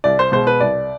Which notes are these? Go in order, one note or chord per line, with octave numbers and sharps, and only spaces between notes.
C2 D5
C5
B2 G#3 C5
B4
C2 D5